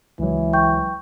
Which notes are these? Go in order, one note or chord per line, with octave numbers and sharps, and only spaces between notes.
C#2 E3 F#3
G5 C#6 G6